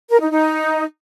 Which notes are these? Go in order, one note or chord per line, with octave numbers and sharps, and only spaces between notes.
A#4
D#4
D#4